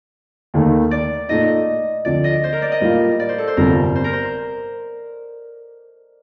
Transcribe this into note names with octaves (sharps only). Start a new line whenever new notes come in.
D#2 D#3 A3 D#4
D5
A#2 A3 D#4 D#5
D2 D3 F3 C4 D5
D#5
C5
A#4
D5
D#5
A2 G3 A#3 F4
D5
C5
A4
C5
G1 F2 C3 G3 A#4
C5
A#4
C5